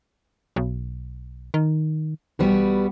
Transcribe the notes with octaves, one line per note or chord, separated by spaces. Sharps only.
B1
D#3
B1 G3 B3 F#4